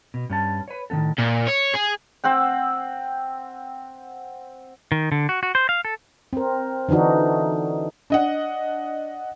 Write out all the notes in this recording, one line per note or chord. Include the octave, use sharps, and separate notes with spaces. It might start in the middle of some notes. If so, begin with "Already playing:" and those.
B2
G2 C#4 A5
B4 C#5
A2 D#3 F3 B3 A4
A#2
C#5
G#4
C4 F#5 G5
D#3
D3
F#4
F#4
C5
F5
A4
C4 A#4
D3 E3 D4 D#4 F#4
D4 D#5 F#5